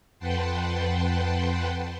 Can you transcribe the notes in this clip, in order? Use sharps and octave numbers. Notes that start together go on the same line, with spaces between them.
F2 B4 F#5 G5 A5 C6